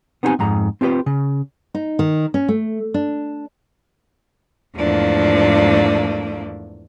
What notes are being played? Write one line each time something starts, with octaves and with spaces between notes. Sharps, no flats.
B3 C4 D#4 E4 G4 G#5
F2 G#2 A#5
C4 F4 G4 B4 C5
C#3
D#4
D#3
C#4
A3
D4
E2 G#2 F3 A3 A#3 D4